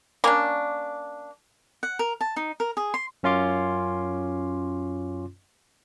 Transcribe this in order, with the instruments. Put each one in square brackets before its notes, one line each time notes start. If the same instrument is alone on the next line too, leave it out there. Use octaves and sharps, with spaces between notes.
[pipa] A#3 C#4 D4
[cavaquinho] F#5
A#4
A5
D#4
A#4
G#4
C6
[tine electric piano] F#2 C#4 F4 C6 D6